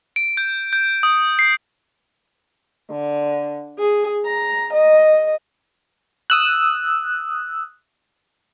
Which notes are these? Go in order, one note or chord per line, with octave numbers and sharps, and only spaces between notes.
D7
G6
G6
D#6
C7
D3
G#4
A#5
D#5
D#6 E6 F#6